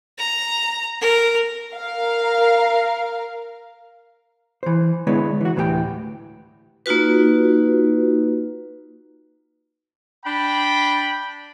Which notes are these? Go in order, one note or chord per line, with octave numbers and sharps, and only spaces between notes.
A#5
A#4
A#4 F5
E3 C5
D3 G#3 B3 E4 B4 C#5
E3 F#4
D2 A2 E3 A3 G4 G5
A#3 D#4 F4 F#4 B4
D4 G5 B5